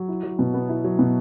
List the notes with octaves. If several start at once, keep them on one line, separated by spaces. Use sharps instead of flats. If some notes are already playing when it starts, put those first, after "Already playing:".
Already playing: F#3
E4
F#3
B2
B3
E4
F#3
B2